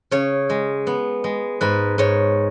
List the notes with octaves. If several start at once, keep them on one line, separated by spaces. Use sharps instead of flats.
C#3 C#5
G#3
B3
G#3
G#2 B4
G#2 C#5